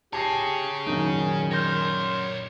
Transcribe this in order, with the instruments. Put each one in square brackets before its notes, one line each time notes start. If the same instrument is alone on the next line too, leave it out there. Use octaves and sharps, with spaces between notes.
[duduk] G4 [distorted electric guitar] G#4 C#5 [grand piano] A5 A#6 C7
[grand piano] F#2 A#2 [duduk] D#3 [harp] D#4
[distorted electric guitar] C#5 C6 [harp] F6 G6 A#6